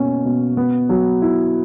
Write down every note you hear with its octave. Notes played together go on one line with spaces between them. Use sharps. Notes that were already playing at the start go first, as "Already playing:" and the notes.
Already playing: B2 A#3 C#4
B2
B3
F#3
E4